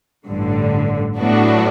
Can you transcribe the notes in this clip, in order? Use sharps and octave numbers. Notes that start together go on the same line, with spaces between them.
A1 G2 D3
A2 F#3 B3 D4 F#4